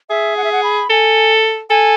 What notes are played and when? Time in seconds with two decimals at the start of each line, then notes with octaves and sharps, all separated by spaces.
0.10 G#4 E5
0.37 F#5
0.44 E5
0.52 F#5
0.63 B5
0.90 A4 G#5
1.70 A4 G#5